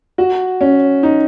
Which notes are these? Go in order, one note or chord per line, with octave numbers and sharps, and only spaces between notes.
F#4
C#4
D#4